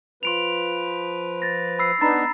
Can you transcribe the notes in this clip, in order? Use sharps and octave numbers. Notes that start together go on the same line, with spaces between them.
F3 B4 C6 D7 F7
A6 A#6
B5 E6 C7
B3 D4 D#4 A#5 B5 A6